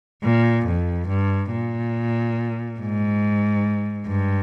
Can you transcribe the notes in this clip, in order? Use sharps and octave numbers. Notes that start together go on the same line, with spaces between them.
A#2
F2
G2
A#2
G#2
G2